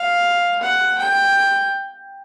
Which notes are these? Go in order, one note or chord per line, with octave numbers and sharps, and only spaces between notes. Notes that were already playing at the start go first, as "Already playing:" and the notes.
Already playing: F5
F#5
G5